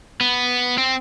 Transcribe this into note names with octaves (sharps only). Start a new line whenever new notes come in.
B3
C4